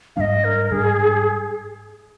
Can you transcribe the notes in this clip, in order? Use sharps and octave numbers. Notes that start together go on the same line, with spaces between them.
G#2 G3 D4 D#5 F5
A#4
G#2 G3 D4 G#4